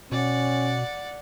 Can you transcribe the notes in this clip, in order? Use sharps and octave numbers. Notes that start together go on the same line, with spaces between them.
B2 C#4 D5 F#5